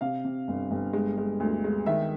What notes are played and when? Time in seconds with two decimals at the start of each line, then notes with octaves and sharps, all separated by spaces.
0.01 C3 F5
0.25 C3
0.48 G1
0.71 G1
0.93 G#3
1.18 G#3
1.40 D2
1.64 G#3
1.86 D#3 E5